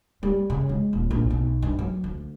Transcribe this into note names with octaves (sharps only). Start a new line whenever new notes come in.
G3
C#3
G#3
D#1
A#1
B1
G2
F#3
D2